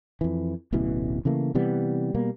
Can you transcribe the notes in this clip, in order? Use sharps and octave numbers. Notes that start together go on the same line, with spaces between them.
F2 E3
D1 A1 B2 E3
C#3 E3 A3 A#3
C3 E3 G3 B3
B2 G3 A#3